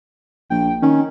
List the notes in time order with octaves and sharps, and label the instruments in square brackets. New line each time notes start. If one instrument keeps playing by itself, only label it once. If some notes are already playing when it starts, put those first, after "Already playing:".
[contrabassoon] A#1 [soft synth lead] G5
[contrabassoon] D#3 [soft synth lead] C#4